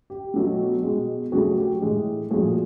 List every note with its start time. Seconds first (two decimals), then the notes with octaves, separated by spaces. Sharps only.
0.10 G4
0.34 B2 F#3 A3
0.83 B2 G#3
1.32 C#3 F#3 A3 F#4 G#4
1.58 G4
1.82 A2 E3 G#3
2.31 A#2 F3 A3 F#4 G#4